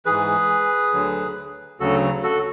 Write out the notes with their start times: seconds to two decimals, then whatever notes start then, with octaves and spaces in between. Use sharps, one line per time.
0.06 G#2 E3 G#4 B4
0.93 D2 D3 F#3
1.80 D2 C#3 F#3 F#4 A4
2.23 F#4 A4